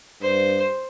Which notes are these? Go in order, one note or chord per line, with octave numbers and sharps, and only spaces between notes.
G2 C5